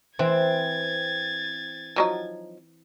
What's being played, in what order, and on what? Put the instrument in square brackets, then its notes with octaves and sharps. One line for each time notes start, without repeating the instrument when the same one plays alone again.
[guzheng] E3 [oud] C4 [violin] G#6 A6
[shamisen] F3 F#3 D#4